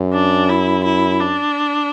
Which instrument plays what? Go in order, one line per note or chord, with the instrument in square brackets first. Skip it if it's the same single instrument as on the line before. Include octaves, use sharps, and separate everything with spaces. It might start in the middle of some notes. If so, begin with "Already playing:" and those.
Already playing: [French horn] F#2
[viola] D4
E4
E4
D4